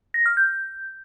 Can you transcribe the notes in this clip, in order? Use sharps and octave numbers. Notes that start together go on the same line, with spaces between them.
A#6
F6
G6